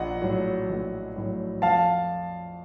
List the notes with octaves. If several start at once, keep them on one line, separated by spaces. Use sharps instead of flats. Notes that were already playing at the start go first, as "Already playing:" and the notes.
Already playing: A#1 D#5 F#5
A2 F#3
A#1
A2 F#3
F2 F5 A5